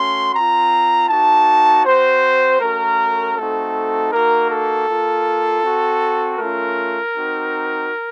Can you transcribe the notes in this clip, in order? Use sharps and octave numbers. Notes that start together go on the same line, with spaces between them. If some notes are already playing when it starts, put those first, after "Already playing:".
Already playing: A3 C#4 F#4 C6
C4 F4 A#5
A#3 D#4 F#4 A5
C4 F#4 C5
A3 C#4 F#4 A#4
A3 C4 D#4 F#4 A4
A#3 D#4 F#4 A#4
A4
A#3 F4
C4 F#4
A3 C#4 F4 A#4
C4 D#4 F#4